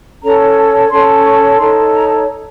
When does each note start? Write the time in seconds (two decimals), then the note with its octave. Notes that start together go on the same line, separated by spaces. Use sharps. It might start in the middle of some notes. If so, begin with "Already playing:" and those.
0.22 C#4 A4 C#5 A#5
0.56 A5
0.90 C#4 A4 C#5 C6
1.25 C#6
1.58 D#4 A4 C#5 C6
1.92 A#5